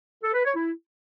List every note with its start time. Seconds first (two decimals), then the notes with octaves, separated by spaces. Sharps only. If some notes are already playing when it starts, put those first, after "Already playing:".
0.23 A4
0.34 B4
0.45 C#5
0.56 E4